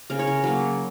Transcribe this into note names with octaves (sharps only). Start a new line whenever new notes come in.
C#3 A#4
C#5
A#4
F#3 A#3